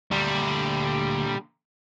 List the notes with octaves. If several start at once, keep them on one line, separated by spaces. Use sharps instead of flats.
D2 A#2 D3 G3